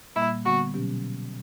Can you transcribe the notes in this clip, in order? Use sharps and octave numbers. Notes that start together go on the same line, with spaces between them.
A#2 G3 A#3 E4
D3 G3 B3 F#4
B2 F#3 C#4 G4